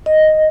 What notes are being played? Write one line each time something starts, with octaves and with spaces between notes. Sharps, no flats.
D#5